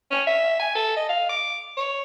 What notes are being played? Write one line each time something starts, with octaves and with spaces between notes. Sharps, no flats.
C#4
E5
G#5
A4
D#5
F5
D6
C#5